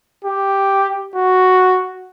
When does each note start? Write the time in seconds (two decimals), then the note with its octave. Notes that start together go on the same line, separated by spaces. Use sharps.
0.25 G4
1.15 F#4